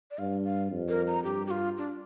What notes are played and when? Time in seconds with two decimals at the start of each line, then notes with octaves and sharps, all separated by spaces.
0.11 D5
0.19 G2 F5
0.44 F5
0.71 F2
0.89 A#4
1.07 A#5
1.24 G2 G4
1.47 G4
1.51 F4
1.78 D4